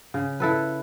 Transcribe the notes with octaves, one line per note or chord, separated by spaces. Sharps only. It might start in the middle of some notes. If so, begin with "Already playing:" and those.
C#3
E4 A4 B4